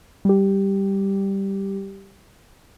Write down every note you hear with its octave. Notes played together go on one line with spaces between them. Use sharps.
G3 G4